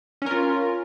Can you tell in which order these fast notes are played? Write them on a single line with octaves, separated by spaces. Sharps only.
C#4 A#4 F4